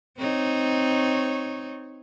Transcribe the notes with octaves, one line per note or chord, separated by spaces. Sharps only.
C4 D#4 C#5